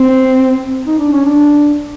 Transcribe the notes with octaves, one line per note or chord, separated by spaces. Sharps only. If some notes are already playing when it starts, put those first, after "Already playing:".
Already playing: C4
D#4
D4
C#4
D4